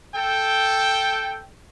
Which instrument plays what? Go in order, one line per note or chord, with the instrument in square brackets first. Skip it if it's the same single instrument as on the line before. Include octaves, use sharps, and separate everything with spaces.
[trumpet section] A4 G5